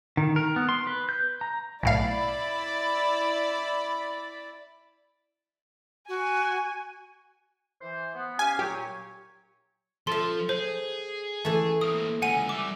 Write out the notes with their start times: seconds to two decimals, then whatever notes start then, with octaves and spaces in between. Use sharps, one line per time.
0.17 D#3
0.36 A#4
0.56 B3
0.69 C6
0.87 B4
1.09 G6
1.41 A#5
1.83 B1 A2 E4 D5 F5 B5
6.08 F#4 G#5
7.81 E3 C5
8.14 B3
8.39 C#4 G4 F5 G#5
8.59 A#2 F#3 G4 C#5
10.07 F3 A4 E5 C6 G7
10.49 G#4 C5
11.45 E3 A3
11.81 A#3 C4 D#6
12.22 C#2 D3 F#5 G#5 D#7
12.49 G3 E5 D6